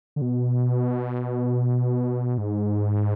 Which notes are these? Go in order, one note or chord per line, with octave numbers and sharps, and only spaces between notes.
D3
B2
G#2